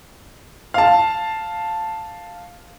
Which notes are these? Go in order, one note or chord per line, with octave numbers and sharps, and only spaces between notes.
F5 A5